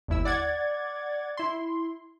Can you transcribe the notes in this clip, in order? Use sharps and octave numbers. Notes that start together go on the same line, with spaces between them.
G1 D#2 E4 E6
D5 F#5 G#6 A6
E4 C6